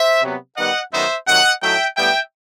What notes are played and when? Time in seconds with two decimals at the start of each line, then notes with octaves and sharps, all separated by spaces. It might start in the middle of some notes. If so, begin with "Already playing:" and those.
Already playing: C5 E5
0.22 C3 F#3 B3
0.57 D#3 G3 B3 D#5 F#5
0.92 F#2 D#3 F#3 B3 D#4 C5 E5
1.27 C3 D#3 F#3 D#5 F#5
1.62 A2 F#3 A3 D#4 E5 G5
1.97 A2 G3 B3 E5 G5